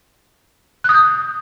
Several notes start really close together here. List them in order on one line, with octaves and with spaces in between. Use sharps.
F#6 D#6 G6